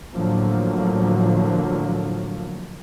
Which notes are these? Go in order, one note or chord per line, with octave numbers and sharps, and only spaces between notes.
A2 D3 F3 F#3 A#3